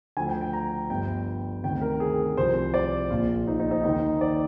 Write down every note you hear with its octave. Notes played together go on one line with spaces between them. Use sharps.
D2 D3 F3 G#5
G5
G5
A#5
G1 G2 F3 G5
D2 C3 D#3 G5
A#4
G#4
C2 C3 F3 C5
D5
A#1 A#2 F3 F4
D#4
D#4
D#4
D#2 D#3 D#4
D5